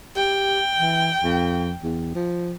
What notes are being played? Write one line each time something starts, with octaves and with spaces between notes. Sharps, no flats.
G4 G5
E3
F2
E2
F3